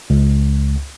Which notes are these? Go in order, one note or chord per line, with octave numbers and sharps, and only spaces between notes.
C#2